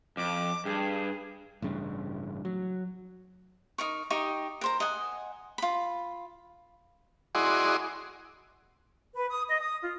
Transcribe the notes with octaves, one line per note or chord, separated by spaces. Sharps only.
F2 D6
G2 G#4
A1 G2 C#3
F#3
D#4 A#4 C#6
D#4 G4 D#5 C#6
A#4 C5 A#5
D#5 F#5 G#5
F4 B5
E4 F#4 G#4 D5 D#5 C6
B4
D#6
D#5
D#6
F4